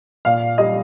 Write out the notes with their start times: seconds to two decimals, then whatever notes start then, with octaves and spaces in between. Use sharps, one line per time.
0.25 A#2 F5
0.58 G3 D#5